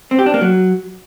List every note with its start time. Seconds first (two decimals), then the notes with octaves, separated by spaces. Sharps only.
0.11 C4
0.19 G4
0.26 D4
0.34 A#3
0.41 F#3